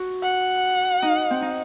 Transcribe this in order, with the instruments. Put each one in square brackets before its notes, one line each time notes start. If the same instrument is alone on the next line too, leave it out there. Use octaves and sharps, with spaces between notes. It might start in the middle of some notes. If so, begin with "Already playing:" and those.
Already playing: [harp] F#4
[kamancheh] F#5
[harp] D#4
C4
D#4